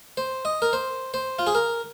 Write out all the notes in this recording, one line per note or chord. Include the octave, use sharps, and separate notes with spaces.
C5
D#5
A#4
C5
C5
F4
G#4
A#4